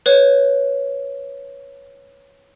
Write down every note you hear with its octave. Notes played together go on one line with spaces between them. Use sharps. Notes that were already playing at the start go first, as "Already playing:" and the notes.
B4 C#5